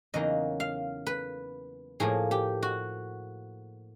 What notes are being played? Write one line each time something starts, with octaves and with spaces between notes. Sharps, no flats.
E2 C#3 F#3 A#3 D#4 D#5
F5
B4
A2 F3 A#3 G#4
G4
F#4